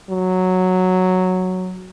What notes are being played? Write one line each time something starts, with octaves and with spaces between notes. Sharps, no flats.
F#3